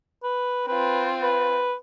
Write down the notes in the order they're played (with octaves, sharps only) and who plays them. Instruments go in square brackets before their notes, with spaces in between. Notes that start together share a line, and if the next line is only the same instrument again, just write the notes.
[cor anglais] B4
[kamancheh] C4 F4 [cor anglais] B4
[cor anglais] B4